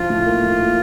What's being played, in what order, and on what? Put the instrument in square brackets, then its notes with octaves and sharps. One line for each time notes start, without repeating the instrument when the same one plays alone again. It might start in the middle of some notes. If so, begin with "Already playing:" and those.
Already playing: [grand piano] F3 [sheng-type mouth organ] F4
[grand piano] A2
A#3
A2
A#3